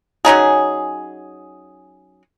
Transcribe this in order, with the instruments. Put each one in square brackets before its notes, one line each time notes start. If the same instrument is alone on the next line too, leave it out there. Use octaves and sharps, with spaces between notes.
[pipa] F#3 C#4 D#4 G#4